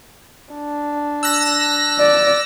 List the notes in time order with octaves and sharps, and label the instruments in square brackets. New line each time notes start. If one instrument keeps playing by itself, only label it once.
[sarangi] D4
[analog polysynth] E6 F#6 A#6
[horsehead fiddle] D5